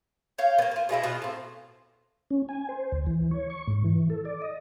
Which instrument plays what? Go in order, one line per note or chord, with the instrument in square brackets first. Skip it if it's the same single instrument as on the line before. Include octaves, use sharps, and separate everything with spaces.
[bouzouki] C#5 F5 G5
A#3 B3
A#3 F4
B2 G#3 E4 E5
B2 B3 F4 F#5
A2 C4
[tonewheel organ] C#4
G#5
C5
D2
E3
C#5
C#6
G#2
E3
A4
D5
D#5